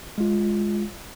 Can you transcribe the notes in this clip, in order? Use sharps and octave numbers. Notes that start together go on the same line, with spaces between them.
G#3 F4